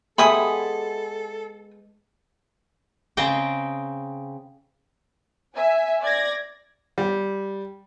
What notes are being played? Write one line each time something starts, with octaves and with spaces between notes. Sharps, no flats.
G#3 B3 G4 A4 E5 G#5 B5 D#6
C#3 C4 D#5 G5
E5 G#5
D5 G#6 A#6
G3